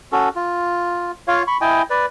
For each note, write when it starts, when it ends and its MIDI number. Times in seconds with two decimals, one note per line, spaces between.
0.12 0.29 61
0.12 0.29 66
0.12 0.29 69
0.36 1.12 65
1.28 1.43 65
1.28 1.43 73
1.28 1.43 77
1.47 1.57 83
1.47 1.57 85
1.61 1.82 64
1.61 1.82 75
1.61 1.82 79
1.61 1.82 80
1.90 2.06 71
1.90 2.06 74